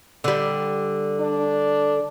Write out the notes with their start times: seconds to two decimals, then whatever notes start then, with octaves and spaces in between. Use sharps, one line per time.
0.24 D3 G3
1.21 D4